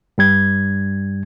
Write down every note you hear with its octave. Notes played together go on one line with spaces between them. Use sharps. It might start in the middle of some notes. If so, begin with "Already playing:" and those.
G2 G3 G#6